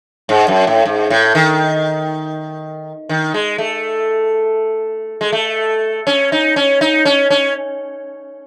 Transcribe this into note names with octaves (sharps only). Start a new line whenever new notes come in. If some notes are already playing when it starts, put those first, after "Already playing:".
G#2
F#2
A2
G#2
A2
D#3
D#3
G#3
A3
G#3
A3
C#4
D#4
C#4
D#4
C#4
C#4